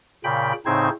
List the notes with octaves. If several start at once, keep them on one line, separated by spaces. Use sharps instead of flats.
A#2 C#3 G5 B5
A2 C#3 C4 D#4 C5 G#6